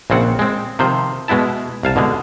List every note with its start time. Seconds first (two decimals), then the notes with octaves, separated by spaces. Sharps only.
0.10 A#1 C#3 C4 F#5
0.39 G#3 C4
0.79 C3 D#3 F3 C5
1.28 B2 G#3 B3 E4 A5
1.83 C2 F5 A5
1.96 B2 D3 G#3 G#4